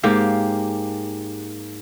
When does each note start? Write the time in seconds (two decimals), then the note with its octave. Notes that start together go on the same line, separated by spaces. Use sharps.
0.03 G#2 A#3 G4 F5